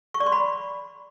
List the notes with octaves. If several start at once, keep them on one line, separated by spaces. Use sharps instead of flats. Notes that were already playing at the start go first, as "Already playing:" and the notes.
C#6
D5
C6
B5